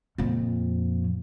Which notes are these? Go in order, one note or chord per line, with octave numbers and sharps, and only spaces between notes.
F2 A#2